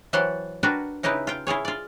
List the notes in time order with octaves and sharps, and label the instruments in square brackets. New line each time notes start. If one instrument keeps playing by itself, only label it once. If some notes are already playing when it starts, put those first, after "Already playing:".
[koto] E3 F#3 G4 C5 F#5 A5
D4 F#4 A#4 B4 G5
C#3 D#4 E4 G4 B4
F4 G5
E4 F4 G#4 C#5
F4 D5